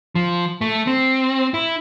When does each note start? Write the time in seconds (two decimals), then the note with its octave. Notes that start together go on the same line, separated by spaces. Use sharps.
0.15 F3
0.61 A3
0.87 C4
1.54 E4